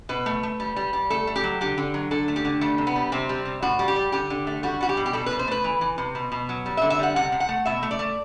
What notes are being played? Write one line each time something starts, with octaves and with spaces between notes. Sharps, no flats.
B2 B4
A3
A3
G3
G3
G3
A3 A4
A3
G4
F#3
D3 G4
D3
F#3
D3 A4
A3
G4
D3
G3 A3
C3
B3
G3
C3 C4
G3
C3
A2 F#4
G3
G4
G3
D3 G4
D3
A3
G3 F#4
G3 F#4
G4
B2
G4
B2 A4
B2 B4
C5
A3 B4
E3
E3
C3
B2
B2
F#3
G3
E5
D3
E5
G3 F#5
C3 F#5
C3
F#5
A3
B2 E5
A3
D5
A3